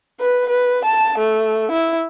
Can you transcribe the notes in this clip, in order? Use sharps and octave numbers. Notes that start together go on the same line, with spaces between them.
B4
B4
A5
A3
E4